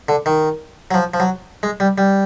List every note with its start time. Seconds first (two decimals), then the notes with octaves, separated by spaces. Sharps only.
0.09 D3
0.26 D#3
0.91 F#3
0.94 F3
1.14 F3
1.20 F#3
1.63 G#3
1.80 G3
1.98 G3